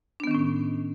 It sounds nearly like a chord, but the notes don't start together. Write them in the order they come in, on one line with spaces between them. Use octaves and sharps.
D4 B3 D#3 C#4 A2